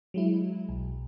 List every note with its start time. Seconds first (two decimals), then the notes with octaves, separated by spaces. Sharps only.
0.14 F#3 G#3 E4
0.69 B1